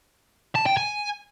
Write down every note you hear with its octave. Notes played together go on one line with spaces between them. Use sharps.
A5
G5
G#5